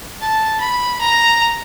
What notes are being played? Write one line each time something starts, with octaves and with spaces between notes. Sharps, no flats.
A5
B5
A#5